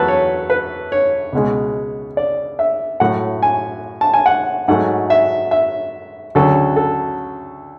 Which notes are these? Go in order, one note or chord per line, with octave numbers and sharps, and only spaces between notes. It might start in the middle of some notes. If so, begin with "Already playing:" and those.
Already playing: E2 F#3 A3 A4 B4
C#5
B4
C#5
C#2 B2 G#3
D5
E5
A2 F#3 A3 F#5
G#5
A5
G#5
F#5
G#2 F#3 A3 F#5
E5
E5
D2 C#3 F#3 A4
A4